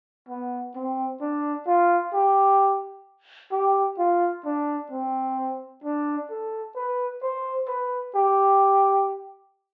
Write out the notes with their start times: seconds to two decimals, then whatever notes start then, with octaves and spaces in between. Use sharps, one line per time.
0.29 B3
0.75 C4
1.21 D4
1.67 F4
2.14 G4
3.52 G4
3.99 F4
4.45 D4
4.91 C4
5.84 D4
6.30 A4
6.76 B4
7.23 C5
7.68 B4
8.15 G4